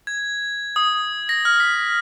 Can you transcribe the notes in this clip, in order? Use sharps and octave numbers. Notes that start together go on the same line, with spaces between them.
G#6
D#6
A#6
F6
B6